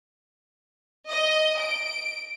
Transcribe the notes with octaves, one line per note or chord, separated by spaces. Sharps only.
D#5
D7